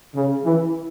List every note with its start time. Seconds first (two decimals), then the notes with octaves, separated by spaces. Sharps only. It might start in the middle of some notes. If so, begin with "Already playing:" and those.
0.15 C#3
0.45 E3